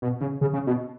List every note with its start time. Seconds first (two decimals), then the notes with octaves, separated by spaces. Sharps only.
0.02 B2
0.21 C#3
0.41 C#3
0.53 C#3
0.67 B2